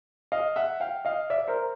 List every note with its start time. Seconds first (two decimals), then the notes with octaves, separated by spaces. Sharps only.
0.32 D#5 F5
0.56 E5 F#5
0.80 F5 G5
1.05 D#5 F5
1.30 D5 E5
1.48 A#4 C5